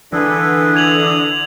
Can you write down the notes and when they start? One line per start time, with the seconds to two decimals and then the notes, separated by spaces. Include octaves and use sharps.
0.13 D3 E3 G#4 A4 B4
0.75 D#6 G#6 F7 F#7